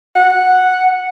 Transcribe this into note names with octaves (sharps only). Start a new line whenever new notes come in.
F#5